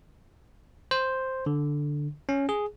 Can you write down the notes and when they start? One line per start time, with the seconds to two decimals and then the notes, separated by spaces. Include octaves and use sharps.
0.91 C5
1.46 D3
2.29 C#4
2.49 G#4